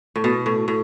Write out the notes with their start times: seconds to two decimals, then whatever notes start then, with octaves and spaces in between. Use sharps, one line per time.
0.16 A2
0.24 B2
0.46 A2
0.68 A2